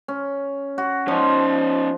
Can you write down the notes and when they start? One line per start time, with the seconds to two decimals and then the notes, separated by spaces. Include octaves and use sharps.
0.08 C#4
0.78 F#4
1.08 F3 C#4 D#4